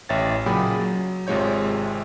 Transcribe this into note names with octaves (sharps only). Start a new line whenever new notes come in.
A1 C#5 E5 G5 A6
A#2 C#3 F#3 G#4 G5 B5
F#3
G#1 C3 G#3 F4 C#5 G6